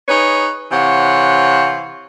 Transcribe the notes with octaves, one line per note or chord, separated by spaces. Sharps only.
D#4 G#4 B4 C#5
C3 E3 C5 C#5 F5 F#5